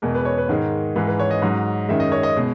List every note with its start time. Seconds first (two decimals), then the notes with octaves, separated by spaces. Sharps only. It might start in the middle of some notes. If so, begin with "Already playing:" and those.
0.02 E2 B2 G#3 A#4
0.15 B4
0.25 C#5
0.38 B4
0.49 G#2 D#3 G#3 A#4
0.96 G#2 E3 G#3 B4
1.07 B4
1.20 C#5
1.31 D#5
1.42 G#2 F#3
1.89 F#2 D#3 G#3 E5
2.00 D#5
2.12 C#5
2.23 D#5
2.37 B2 G#3